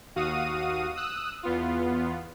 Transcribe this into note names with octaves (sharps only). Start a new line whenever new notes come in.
D#2 F#4 F5 D#6 D#7
D#6 E6 F#6
E2 B3 F4